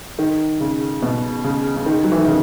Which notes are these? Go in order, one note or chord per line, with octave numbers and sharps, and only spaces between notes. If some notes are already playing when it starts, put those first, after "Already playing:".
D#3
C#3
B2
C#3
C#3
D#3
F#3
E3
D#3
C#3